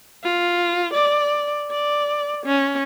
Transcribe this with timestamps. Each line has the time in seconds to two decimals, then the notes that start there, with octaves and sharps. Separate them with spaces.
0.23 F4
0.93 D5
1.71 D5
2.46 C#4